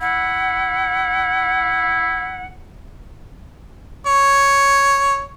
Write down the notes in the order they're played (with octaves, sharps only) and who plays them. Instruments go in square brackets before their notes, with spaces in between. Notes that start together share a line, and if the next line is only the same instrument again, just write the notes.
[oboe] E4 [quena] F#5
[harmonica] C#5